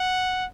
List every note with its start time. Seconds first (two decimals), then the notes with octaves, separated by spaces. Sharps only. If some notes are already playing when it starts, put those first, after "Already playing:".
Already playing: F#5